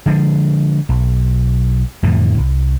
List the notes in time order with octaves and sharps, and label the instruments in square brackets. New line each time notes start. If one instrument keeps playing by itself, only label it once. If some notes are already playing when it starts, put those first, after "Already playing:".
[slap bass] D3 F3 G#3
B1
F2 A2 D3 E3
C2